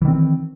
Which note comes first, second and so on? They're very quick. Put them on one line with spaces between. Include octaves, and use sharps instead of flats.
E3 D#3 C4